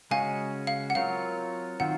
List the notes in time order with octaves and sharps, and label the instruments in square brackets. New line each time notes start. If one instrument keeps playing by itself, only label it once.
[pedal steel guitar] C#3 G#3 C#4 F#4 [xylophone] F5 G#5
[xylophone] F5
F#5
[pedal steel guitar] F#3 C4 F4 A#4 C#5 [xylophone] F5
[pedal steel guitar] D#3 F#3 C4 F4 [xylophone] F#5